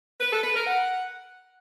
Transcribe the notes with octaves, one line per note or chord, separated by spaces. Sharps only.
B4
A4
B4
A#4
F#5